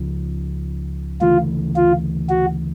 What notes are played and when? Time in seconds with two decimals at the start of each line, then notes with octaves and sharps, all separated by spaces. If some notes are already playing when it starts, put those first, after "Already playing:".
Already playing: C#2 C#3 F3
1.21 D2 C#3 E3 A3 F4
1.76 F4
2.30 F#4